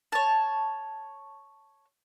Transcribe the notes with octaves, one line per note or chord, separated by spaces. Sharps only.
C#5 A5